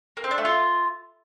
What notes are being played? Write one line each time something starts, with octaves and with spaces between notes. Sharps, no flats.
A#3
C4
D4
A3
F4